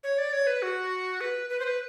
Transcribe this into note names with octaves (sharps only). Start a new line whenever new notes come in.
C#5
D5
C#5
B4
F#4
B4
B4
C5
B4